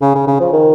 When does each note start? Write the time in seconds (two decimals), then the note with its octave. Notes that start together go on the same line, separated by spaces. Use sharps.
0.02 C#3
0.15 C#3
0.27 C#3
0.40 F3
0.53 D#3